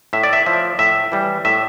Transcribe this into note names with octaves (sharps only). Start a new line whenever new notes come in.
A2 E5
D5
E5
F3 E5
A2 E5
E3 G3
A2 E5